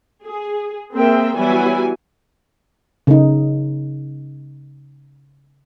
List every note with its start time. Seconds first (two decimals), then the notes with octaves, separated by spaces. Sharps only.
0.24 G#4
0.94 A#3 C4 G#4 A#4 E5 G5
1.35 E3 F#3 G3 B3 E4 G#5
3.07 C#3 D#4